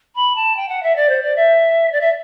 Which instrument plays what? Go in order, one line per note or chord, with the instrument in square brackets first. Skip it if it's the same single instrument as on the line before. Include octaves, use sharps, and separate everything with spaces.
[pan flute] B5
A5
G5
F#5
E5
D5
C5
D5
E5
D5
E5